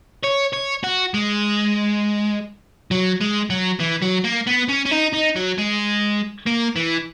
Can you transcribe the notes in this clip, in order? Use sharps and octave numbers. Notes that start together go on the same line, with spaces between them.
C#5
C#5
F#4
G#3
F#3
G#3
F#3
E3
F#3
A#3
B3
C#4
C#4
D#4
D#4
F#3
G#3
A#3
E3